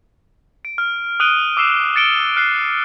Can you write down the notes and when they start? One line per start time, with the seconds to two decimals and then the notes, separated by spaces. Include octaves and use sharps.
0.65 D7
0.78 F6
1.20 D#6 F#6 D7 D#7 G7
1.57 D6 E6 C7 E7
1.96 A6 C#7 D7 G7
2.36 F6 F#6 C7 D7